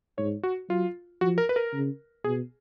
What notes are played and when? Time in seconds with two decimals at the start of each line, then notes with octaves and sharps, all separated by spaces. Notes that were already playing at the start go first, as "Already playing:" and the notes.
0.18 G#2 C#5
0.43 F#4
0.70 F#3 F4
1.21 F3 F#4
1.38 A#4
1.49 B4
1.56 A#4
1.73 C#3
2.24 B2 G#4